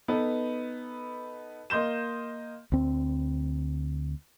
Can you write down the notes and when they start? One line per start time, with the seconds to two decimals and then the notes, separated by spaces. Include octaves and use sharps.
0.08 B3 D#4 A4 B4
1.70 A#3 D#5 C6 G6 E7
2.72 D2 C4